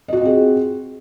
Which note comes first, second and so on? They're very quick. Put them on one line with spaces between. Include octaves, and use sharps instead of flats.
D#5 F#4 F4 C4 G#4